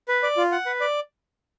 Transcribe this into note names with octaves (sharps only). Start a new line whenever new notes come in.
B4
D5
F4
F#5
B4
D5